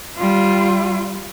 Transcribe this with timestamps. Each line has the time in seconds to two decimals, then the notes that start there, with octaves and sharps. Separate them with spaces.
0.17 G3 F4